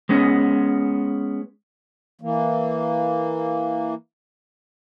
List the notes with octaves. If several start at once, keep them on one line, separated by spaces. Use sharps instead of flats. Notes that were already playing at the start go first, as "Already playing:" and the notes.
G#3 B3 C#4
E3 A#3